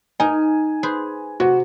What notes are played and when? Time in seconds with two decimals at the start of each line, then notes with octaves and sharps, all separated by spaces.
0.20 D#4 A#4 G#5
0.83 G#4 B4 C5
1.40 C3 F#4